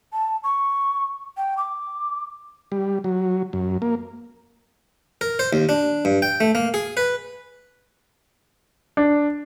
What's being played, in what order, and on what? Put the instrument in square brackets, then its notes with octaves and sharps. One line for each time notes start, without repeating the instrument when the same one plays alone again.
[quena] A5
C#6
G5
D6
[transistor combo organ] G3
F#3
F#2
A#3
[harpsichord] A#4
C5
D#2
D4
G2
G5
A3
A#3
G#4
B4
[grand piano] D4